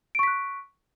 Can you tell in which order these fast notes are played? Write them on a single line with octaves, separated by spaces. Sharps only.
D7 C#6 B6 F#6